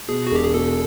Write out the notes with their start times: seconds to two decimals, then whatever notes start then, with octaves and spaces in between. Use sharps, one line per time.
0.08 B2 G#4
0.27 F#4
0.31 E1 G4
0.44 G#4
0.54 B2 A4